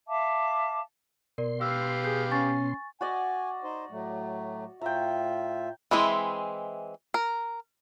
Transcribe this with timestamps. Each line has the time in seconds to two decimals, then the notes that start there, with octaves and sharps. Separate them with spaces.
0.07 E5 F5 A5 D6
1.38 B2 A#4 D5 C6
1.61 G4 B4 F5 E6
2.04 G#4 G6
2.32 C#4 G#5 C#6 A6
3.01 F#4 D5 D#5 G#5
3.64 D#4 C5
3.90 A2 F#3 A3
4.81 A2 F4 E5 G5 A#5
5.91 E3 G#3 C4 E4
7.14 A#4